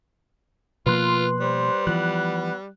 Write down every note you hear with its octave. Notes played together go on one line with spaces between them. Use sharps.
B2 F3 A#3 F4 B4 C6 F#6
G3 C5
E3 F3 B3 F#6